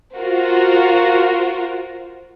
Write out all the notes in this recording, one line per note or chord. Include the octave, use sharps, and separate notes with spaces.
F4 F#4 A#4 C5